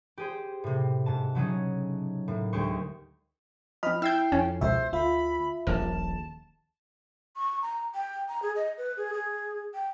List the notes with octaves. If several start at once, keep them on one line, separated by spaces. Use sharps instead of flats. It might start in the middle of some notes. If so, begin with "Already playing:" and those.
G4 G#4 C5
A2 C3
G#2 A5
C#3 F#3 C#4 D#4
A2 A#3
D2 G#3 G4 C5 C#6
F3 C4 D#5 B5 F6
E4 G5 E6 G6 C7
F2 C#4
C#2 B2 C5 E5
D2 F4 E5 B5
D#1 A#1 A#4 A5
C#6
A#5
G5
A#5
G#4
D#5
B4
G#4
G#4
G5